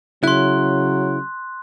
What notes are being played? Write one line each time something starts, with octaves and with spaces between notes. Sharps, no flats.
C#3 F#3 E4 C6 F#6